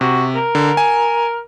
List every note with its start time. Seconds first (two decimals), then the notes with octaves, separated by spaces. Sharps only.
0.01 C3 F#4
0.35 A#4
0.55 D3
0.77 G#5